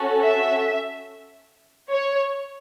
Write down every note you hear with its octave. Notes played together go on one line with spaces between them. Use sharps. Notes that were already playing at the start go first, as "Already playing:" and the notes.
Already playing: C#4 F#4 A4
E5
C#5